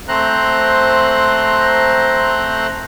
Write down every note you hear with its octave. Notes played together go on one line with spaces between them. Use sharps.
A3 C4 C5 A#5 C6 F#6